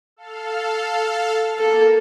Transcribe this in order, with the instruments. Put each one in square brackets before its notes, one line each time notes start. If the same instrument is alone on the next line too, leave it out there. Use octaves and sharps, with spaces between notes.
[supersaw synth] A4 F5
[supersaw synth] A#3 [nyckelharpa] A4